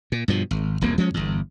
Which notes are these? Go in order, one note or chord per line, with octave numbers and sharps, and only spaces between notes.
A#2
G2 B2 F3
G#1
E1 C2 F2 A#3
F3 G#3 C#4
G1 E2